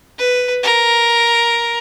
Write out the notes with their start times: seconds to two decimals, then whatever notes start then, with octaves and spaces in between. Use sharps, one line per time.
0.18 B4
0.63 A#4